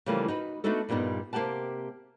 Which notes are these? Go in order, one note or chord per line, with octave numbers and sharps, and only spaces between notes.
C#3 E3 F3 G3 A3 A#3
D#4 F#4 B4
A3 B3 D4 D#4 F#4 A4
G2 A#2 G3 B3 D#4
C3 A#3 E4 G4 F#5 A5